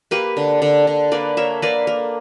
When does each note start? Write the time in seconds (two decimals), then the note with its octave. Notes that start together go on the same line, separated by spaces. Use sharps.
0.11 A#3 G4 B4
0.37 D3
0.62 D3
0.87 D3
1.12 A#3 B4 D5
1.37 A#3 C#5 E5
1.62 A#3 B4 D5
1.87 A#3